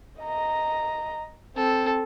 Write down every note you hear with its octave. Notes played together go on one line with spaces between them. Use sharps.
D#5 A#5
C4 A4